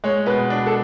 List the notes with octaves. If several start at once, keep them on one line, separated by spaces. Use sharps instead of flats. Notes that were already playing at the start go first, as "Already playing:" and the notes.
G#3 C#5
B2 B4
D4
A4